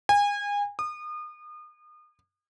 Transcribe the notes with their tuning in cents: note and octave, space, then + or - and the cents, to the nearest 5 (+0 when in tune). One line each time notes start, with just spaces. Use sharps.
G#5 -30
D#6 -35